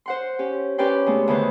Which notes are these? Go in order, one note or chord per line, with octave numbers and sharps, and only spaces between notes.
C5 F#5 C6
C#4 G4
C#4 G4 B4 D5 G5 C6
C3 G#3 A3 B3
D2 D3 D#3 B3 B4 C5